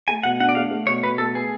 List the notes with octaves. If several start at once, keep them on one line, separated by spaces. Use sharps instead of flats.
A3 G#5
B2 F#5
D4 F#5
D5
A3 F5
A3
B2 C#5
B2 B4
A3 A4
B3 G#4